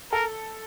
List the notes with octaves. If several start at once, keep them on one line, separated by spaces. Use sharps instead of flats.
A4 A#4